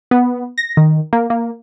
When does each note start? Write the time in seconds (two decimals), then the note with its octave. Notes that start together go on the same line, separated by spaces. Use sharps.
0.11 B3
0.58 A#6
0.77 D#3
1.13 A#3
1.30 A#3